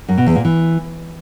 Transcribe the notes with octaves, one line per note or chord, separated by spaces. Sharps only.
F#2
B2
E2
A#2
E3